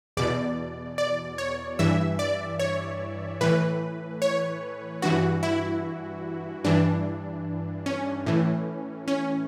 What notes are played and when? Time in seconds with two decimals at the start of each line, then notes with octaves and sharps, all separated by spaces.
0.17 E2 B2 D5
0.98 D5
1.38 C#5
1.79 G2 E3 E5
2.19 D5
2.59 C#5
3.41 A2 E3 B4
4.22 C#5
5.02 G2 E3 F#4
5.43 E4
6.64 G2 E3 D4
7.86 C#4
8.26 A2 E3
9.08 C#4